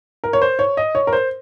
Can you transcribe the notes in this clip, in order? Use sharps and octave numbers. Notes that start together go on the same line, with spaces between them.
A#4
C#5
C5
C#5
D#5
C#5
A#4
C5